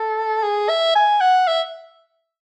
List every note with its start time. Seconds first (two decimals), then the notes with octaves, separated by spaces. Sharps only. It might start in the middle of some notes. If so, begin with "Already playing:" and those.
Already playing: A4
0.43 G#4
0.69 E5
0.95 G#5
1.21 F#5
1.47 E5